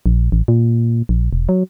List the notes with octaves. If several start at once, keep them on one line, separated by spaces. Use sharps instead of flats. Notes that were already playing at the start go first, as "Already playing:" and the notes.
A#1
A1
A#2
A#1
E1
F#3